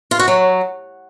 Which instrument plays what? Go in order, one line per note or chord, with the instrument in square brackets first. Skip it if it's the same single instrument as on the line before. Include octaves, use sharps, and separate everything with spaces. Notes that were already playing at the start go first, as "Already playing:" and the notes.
[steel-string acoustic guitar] F4
F#4
F#3